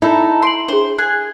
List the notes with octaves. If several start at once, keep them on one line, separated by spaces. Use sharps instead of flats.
D#4 E4 A4
C6 C7 D7 F#7
D4 G#4 C5
G#4 F#6